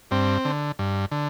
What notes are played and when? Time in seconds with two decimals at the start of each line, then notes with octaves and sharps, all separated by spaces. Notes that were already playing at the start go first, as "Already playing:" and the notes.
0.11 G2 C4
0.45 D3
0.79 G2
1.11 D3